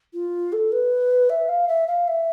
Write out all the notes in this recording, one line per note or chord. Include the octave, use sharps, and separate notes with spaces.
F4
A4
B4
E5
F5
E5
F5
E5